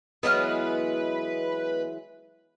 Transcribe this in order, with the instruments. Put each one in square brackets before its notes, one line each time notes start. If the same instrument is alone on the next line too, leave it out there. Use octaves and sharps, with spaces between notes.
[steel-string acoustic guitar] E3 F#3 G#3 [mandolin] B3 D#5 F6 [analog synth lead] B4